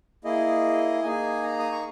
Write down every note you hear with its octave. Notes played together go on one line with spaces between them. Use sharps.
A#3 E4 G#4 D#5
A#3 D#4 G#4 G#5
A#5
D#6
C#6